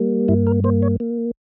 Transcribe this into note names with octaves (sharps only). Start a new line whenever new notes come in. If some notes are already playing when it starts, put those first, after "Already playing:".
Already playing: G3 A#3
G2 E4
A#4
A#3 C5
C#5
A#3